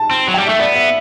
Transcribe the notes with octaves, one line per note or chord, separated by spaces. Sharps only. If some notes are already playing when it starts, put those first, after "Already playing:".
Already playing: A5
C4
F#3
G3 G5
A3 E5
B3 D5
E5